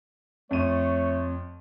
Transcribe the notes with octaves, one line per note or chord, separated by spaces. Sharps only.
F2 A3 C#5 D#7